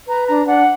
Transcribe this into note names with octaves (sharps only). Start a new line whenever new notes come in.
B4 A#5
D4 A#5
D4 F#5